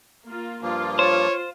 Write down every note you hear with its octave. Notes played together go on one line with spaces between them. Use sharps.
A#3 F4
G2 F3 A#3 F4
C5 C#5